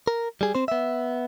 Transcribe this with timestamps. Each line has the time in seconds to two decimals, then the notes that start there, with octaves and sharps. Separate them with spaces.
0.07 A#4
0.41 G3 G#4
0.55 C4 C5
0.68 B3 E5